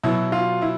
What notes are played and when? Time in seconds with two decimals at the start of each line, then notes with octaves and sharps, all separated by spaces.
0.03 B2 F#3 E4
0.32 F4
0.62 E4